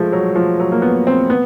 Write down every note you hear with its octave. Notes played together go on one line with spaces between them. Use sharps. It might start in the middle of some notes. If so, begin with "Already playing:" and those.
Already playing: F3 G#3 A3
F#3
F3
F#3
A#3
B3
C4
B3